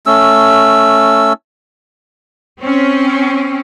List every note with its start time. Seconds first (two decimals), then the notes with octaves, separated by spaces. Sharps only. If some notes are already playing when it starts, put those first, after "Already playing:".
0.06 A3 C#4 E6
2.60 C4 C#4